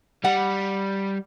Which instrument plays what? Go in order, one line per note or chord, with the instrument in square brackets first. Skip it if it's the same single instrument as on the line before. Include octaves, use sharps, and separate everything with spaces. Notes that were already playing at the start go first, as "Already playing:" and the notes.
[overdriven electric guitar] G3 [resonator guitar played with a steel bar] F#5